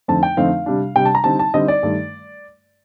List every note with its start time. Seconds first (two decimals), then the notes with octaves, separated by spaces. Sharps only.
0.08 F2 D3 A3 C4 D#4 A5
0.23 G5
0.37 F2 D3 A3 C4 D#4 F5
0.66 C3 G3 D4
0.96 C3 G3 D4 G5
1.05 A5
1.15 A#5
1.24 D3 G3 C4 D#4 A5
1.39 A5
1.54 D3 G3 C4 D#4 D#5
1.68 D5
1.83 G2 D#3 A3